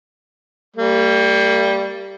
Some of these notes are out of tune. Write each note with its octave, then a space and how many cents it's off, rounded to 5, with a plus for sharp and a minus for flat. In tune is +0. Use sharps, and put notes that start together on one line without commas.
G3 +0 A#3 -40